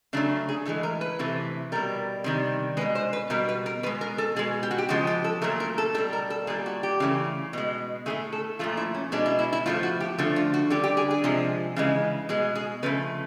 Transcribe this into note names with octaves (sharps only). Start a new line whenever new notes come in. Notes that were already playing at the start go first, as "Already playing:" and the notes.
C#3 F#3 A3 D4
G#4
A2 E3 G#3 A4
A#4
B4
C3 E3 A3
B2 G3 A#4
C3 D#3 G3
B2 G#3 B4
C5
B4
B2 G3 A#4
B4
A#4
B2 G#3 B4
A#4
A4
B2 G#3 G#4
G4
F#4
G4
C#3 F3 G#3 F#4
G4
A4
A#2 F#3 A3 A#4
A#4
A4
B2 G3 A4
A#4
A4
A#2 G3 G#4
F#4
G4
C#3 E3 A3
B2 G#3
A2 E3 A3 G#4
A4
A#2 F3 A3 F4
E4
C#4
B2 G#3 D4
E4
E4
E4
A2 F3 A3 F4
F#4
G4
D3 F3 A3 F#4
F4
F#4
D3 G3 G4
G4
G#4
G#4
C3 F3 G#3
C#3 E3 G#3
B2 G#3 G#4
G#4
C#3 F3 A3 B4